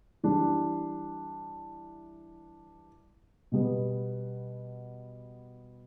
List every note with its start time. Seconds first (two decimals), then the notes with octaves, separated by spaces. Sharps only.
0.23 E3 G3 D4
3.52 B2 G3 B3